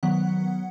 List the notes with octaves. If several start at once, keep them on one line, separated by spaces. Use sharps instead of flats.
D#3 F#3 B3 F#5